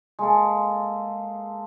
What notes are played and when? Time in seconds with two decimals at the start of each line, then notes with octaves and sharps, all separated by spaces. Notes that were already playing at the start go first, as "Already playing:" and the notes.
0.19 G#3 A#3 A4